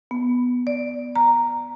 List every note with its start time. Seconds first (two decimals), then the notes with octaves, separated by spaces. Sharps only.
0.11 B3
0.67 D5
1.15 A#5